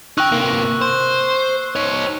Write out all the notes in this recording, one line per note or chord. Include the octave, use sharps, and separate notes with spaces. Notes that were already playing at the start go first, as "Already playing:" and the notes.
D#4 G5 C#6 E6 F#6
C3 A#3
C5
D#4 C#5